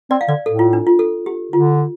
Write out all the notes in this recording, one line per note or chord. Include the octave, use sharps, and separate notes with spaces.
C4 D5
F5
D3 D5
A2 A4
F4
D4
F4
A4
G4
D3 F4